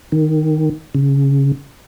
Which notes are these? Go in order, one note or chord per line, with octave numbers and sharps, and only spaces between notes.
D#3
C#3